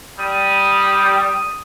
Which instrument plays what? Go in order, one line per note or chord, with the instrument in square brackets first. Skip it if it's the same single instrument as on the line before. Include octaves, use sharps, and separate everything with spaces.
[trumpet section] G3 [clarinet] D#6